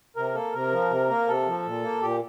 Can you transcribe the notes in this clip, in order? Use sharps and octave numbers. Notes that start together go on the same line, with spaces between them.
C3 A#4
A#3 A4
C3 A#4
F3
C3
A#3
C3 A4
F3
A#2
A#3
A#2 G4